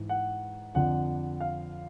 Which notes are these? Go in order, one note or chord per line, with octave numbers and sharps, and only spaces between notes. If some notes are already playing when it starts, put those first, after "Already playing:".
Already playing: G#2 E3
F#5
F2 D3 F3 F#5
F5